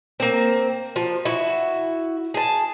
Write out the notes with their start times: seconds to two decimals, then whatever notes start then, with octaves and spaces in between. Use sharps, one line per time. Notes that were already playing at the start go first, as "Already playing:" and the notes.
0.20 A#3 C4
0.96 F3
1.25 E4 F#4
2.34 G#4 A5